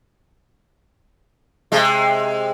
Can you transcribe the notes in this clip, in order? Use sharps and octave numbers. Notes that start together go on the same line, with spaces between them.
C3 G#3